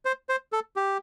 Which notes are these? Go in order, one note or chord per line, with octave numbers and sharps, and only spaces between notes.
C5
C5
A4
G4